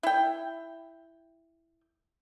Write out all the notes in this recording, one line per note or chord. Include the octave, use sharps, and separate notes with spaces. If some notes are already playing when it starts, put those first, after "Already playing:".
E4 G5